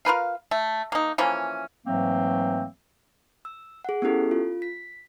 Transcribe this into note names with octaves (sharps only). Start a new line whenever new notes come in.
F4 A#4 B4 F5
A3
A#3 D#4
E3 F3 A#3 C#4
G#2 E3 F#3 A3 A#3 C4
E6
G#4 F#5
B3 C#4 E4 G4 A4
F4
B6